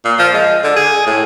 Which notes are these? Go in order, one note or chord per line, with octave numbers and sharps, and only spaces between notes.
A#2
F3
G#3
D3
G#4
A2